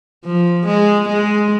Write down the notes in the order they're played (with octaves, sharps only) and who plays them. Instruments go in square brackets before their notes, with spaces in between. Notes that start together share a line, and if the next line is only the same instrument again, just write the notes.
[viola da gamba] F3
G#3
G#3